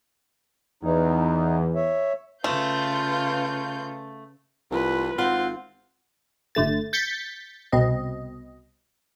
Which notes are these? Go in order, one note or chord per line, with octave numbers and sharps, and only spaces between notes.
E2 D#4
C#5 E5
C#3 A3 F4 B4 F5 G6
C2 F4 B4
G#1 C4 F4 F#5
G1 D3 A3 A6
G6 A6 B6 C#7
C2 B2 C4 D#5